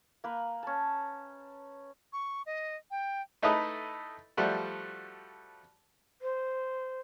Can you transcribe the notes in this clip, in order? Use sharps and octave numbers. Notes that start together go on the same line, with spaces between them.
A#3 B4
C#4 A5
C#6
D#5
G5
A3 D#4 E4 A4 B4 D#5
F3 G3 A3 F#4
C5